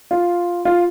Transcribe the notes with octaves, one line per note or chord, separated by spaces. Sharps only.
F4
F4